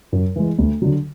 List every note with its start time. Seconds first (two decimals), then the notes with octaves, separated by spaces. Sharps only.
0.12 F#2
0.36 E3 G#3
0.59 D2
0.82 D3 F#3